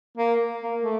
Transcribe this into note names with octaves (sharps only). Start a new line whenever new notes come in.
A#3
A#3
A3